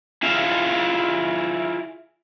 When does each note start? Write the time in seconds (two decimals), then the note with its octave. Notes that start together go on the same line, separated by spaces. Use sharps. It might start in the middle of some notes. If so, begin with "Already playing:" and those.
0.23 E4 F4 G#4 E5 F5